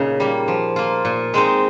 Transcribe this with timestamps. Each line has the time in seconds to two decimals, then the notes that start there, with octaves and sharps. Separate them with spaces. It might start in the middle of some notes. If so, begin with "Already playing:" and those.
Already playing: A#2 C#3 D#4
0.20 G3 A#3
0.48 F3
0.76 A#3 F4
1.05 A#2
1.34 G#3 C4 D#4